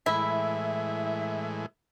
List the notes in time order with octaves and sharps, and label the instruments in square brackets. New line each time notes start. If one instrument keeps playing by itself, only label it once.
[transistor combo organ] A2 E3 G#3 [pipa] E4 [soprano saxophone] E5